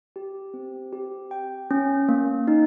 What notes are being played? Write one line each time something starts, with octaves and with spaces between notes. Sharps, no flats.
G4
C4
G4
G5
C#4
A#3
D#4